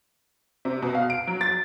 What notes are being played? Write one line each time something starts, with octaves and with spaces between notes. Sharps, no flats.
C3
B2
F5
D7
F#3
A6